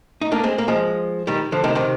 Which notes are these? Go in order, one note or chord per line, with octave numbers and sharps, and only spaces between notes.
D#4
A#3 D4
G#3 C4
A#3
F3 G#3
D#3 G3
D3 F3
C3 D#3
C3 D#3